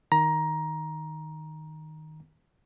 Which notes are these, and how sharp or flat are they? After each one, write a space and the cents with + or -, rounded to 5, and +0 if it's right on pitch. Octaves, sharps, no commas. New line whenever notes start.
D#3 +0 A#5 +15